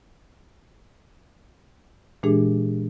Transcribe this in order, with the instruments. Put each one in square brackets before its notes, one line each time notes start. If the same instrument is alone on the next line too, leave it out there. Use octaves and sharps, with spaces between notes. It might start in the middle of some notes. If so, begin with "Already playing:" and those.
[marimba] A#2 E3 G#3 D4 G4 G#4